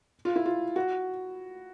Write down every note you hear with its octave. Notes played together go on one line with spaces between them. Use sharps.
F4
E4
F4
F#4